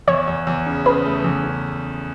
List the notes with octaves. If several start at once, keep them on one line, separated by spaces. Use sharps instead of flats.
E2 C#5
E2
E2
C#3
C#3 B4
A3
E2
C#3